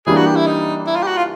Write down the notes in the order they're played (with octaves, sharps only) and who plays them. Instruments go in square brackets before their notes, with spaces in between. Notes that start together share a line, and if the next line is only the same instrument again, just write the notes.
[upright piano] E3 G3 A#3 D4 [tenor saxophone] G#4
[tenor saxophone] F#4
G4
E4
D#4
E4
F4
G4
F#4
F4